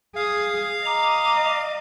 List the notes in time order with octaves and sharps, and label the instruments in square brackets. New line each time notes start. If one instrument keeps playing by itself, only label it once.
[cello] G#4 [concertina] F5
[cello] D#5 [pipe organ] A#5 D6